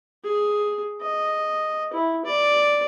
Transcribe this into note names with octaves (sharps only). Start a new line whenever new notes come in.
G#4
D#5
E4
D5